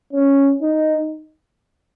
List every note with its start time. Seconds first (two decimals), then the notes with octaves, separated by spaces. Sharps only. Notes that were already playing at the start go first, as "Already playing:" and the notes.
0.13 C#4
0.62 D#4